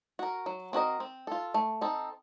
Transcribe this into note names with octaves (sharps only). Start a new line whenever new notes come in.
F#4 A#4
F#3
C4 F#4 A#4 D#5
C4
F4 A4
A3
C4 D#4 A4